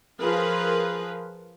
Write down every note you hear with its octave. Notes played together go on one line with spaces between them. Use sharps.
F3 F4 G#4 A#4 B4